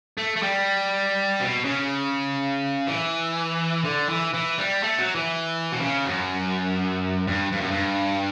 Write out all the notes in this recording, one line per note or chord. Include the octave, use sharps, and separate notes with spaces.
A3
A3
G3
B2
C#3
E3
D3
E3
E3
G3
A3
F#3
E3
B2
C#3
F#2
G2
G2
F#2
G2